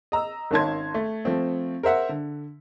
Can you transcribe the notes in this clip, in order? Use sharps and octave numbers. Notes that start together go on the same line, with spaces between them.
D#5 A#5 E6
G#1 C#4 D#4 A5 C6 G#6
A3
F3 A3 C4
A#4 C5 E5 F#5
D3